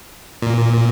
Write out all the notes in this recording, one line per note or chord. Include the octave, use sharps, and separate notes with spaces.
A#2